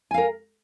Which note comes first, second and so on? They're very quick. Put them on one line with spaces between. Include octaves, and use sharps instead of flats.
G#5 F5 A#4